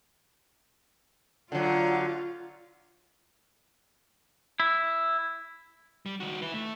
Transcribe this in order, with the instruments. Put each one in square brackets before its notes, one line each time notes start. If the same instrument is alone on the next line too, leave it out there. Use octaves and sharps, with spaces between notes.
[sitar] D3 F#3 [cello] F4
[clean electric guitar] E4
[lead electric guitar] G3
D#3 F#4
E4 B4
A3